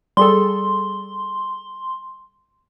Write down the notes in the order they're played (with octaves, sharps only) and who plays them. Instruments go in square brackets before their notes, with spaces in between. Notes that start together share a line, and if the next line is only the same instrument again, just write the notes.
[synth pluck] G3 G#4 A4 [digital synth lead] C6